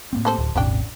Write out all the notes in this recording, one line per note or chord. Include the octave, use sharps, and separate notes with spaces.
A2 A#3 C4
G3 A4 C5
D1
D#1 G#1 C3 C#4 D4 G5